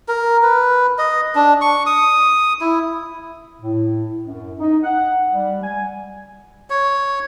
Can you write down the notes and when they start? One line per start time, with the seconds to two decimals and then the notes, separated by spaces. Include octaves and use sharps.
0.08 A#4
0.43 B4
0.98 D#5
1.35 D4
1.61 C#6
1.86 D#6
2.61 E4
3.61 A2
4.25 F#2
4.60 D#4
4.83 F#5
5.31 G3
5.62 G#5
6.70 C#5